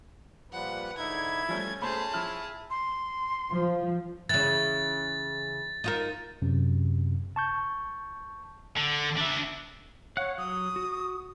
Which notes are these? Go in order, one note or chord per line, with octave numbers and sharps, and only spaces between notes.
A#2 F3 G3 B4 F#5
G#2 D3 D#4 E4 G#6
F3 G3 A3 C#4
B2 A3 G#4 C5 A5 B5
F3 E4 F6 F#7
C6
F3
C#3 E3 A6
D#4 F4 A#4
F#2 C3
A5 C#6 G6
D3
D4 E5
C#5 F5 F#5 F#6
F#3 D#6
F#4